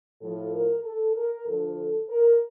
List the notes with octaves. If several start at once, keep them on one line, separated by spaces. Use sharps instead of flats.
A2 F3 A4
A#4
A4
A#4
D2 D3 F3 A4
A#4